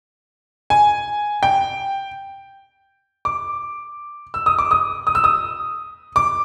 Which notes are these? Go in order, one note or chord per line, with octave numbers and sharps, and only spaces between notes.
G#5
G5
D6
E6
D#6
D6
D#6
D#6
E6
D#6
D6